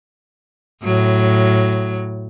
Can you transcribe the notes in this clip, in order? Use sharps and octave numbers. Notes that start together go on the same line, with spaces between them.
A2 F#3